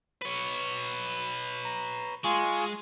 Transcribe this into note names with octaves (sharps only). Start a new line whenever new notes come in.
B4 C#5
A#5
G#3 F4 G#4 C#6